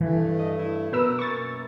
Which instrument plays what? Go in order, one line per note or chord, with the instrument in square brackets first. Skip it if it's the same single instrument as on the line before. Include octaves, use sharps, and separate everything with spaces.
[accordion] G2 A3 [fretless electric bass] E3
[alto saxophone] D#5
E4
[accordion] F#2 [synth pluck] B2 B4 E6 [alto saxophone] A#4
[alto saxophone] A#3 [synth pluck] C#6 A6